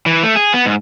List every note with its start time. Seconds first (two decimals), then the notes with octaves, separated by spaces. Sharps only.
0.06 E3
0.23 A3
0.36 G#4
0.54 B3
0.66 G#2